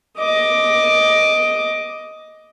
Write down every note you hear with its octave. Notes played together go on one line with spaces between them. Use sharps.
D#5 D6